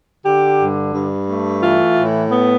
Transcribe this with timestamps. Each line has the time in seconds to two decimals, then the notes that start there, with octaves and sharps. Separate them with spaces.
0.25 D3 G4
0.59 G2
0.93 G2
1.28 A3
1.63 E3 F4
1.97 A2
2.32 B3